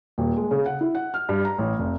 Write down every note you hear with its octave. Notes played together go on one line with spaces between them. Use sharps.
D#1
G#3
C#3
F#5
E4
F#5
F6
G2
A#5
A1
F1